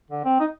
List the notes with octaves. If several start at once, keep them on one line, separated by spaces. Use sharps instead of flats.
D3
C4
D#4